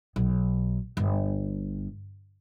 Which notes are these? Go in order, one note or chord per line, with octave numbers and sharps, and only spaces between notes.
B1
G1